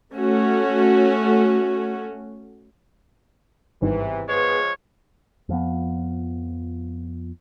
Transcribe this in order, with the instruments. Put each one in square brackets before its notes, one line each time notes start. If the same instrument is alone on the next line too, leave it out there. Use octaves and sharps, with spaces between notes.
[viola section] A3 C#4 F#4
[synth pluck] G#1 G2 D#3 [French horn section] E2 C3 E3
[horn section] F3 G#3 C#5 [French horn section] B3 G#4 B4
[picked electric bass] F2 F3 B3